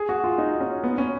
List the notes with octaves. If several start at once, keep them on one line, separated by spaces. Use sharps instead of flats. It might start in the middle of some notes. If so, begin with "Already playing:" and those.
Already playing: G#4
F#4
F4
D#4
C#4
B3
C#4